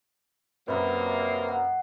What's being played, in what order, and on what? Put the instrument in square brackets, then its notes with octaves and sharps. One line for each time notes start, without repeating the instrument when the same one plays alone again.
[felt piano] F#2 [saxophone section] C3 F#3 A#3 [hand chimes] B4 B5
[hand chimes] F#5